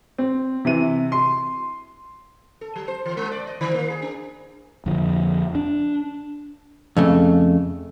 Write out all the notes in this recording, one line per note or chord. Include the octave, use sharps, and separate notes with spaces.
C4
C3 E3 D#7
C6
A4
F#3
C5
E3
G#3
D5
D#5
D#3
A#3
G#4
D4
F2 D3 F3
D4
F2 C#3 A3